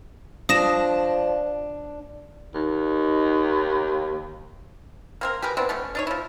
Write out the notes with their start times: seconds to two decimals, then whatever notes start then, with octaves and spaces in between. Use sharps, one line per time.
0.49 F3 D4 D#6 A#6 E7
2.54 D#2 D#4
5.21 A#3 C4 A#4
5.42 G4 G#4 A#4 B4
5.57 E3 B3 C4 D4
5.69 B2 A3 C#4
5.95 D4 D#4 C#5
6.07 F3 E4